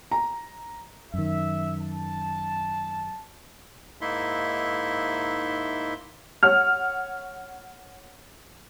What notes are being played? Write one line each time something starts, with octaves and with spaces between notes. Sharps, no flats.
A#5
F#2 D#3 E5
A5
G#2 A#3 D#4 E4 E5 C6
C#5 F#5 F6